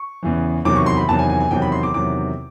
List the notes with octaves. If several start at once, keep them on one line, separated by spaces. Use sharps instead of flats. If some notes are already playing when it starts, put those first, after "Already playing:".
Already playing: C#6
E2 C#3 E3
E2 C3 D#3 F#3 D6
C#6
C6
B5
E2 C3 D#3 F#3 A5
G#5
G#5
G#5
E2 C3 D#3 F#3 G5
B5
C6
D6
E2 C3 D#3 F#3 D6